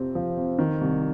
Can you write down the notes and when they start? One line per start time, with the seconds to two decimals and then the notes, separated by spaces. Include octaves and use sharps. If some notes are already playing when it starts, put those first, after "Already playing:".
Already playing: F2 C3 F3 C4
0.15 F3
0.37 F2
0.59 D#3
0.81 C2